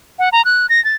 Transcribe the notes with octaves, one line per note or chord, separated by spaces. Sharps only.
F#5
A#5
F#6
A#6
A6